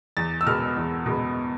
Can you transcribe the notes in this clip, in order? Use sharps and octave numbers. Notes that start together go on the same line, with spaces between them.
E2 A6
E6
B2 G#3 B3 F6
E2
B2 G#3 B3